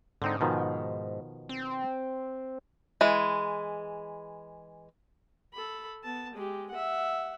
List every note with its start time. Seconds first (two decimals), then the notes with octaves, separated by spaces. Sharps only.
0.22 G#2 D3 C4 D#4
0.41 B2 D#3 F3
1.49 C4
3.01 E3 G#3
5.54 A4 B5
6.04 B3 A5
6.34 G#3 G4
6.71 E5 F#5